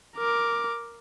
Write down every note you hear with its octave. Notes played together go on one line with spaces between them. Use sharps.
A#4 D6